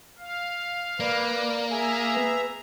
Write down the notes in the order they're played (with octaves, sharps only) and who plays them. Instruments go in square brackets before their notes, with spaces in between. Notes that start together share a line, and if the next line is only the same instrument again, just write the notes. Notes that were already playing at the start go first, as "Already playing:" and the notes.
[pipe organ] F5
[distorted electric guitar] A#3 [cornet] B4 [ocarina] D5
[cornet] G#4 [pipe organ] E5 A#5 [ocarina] G#5
[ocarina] B4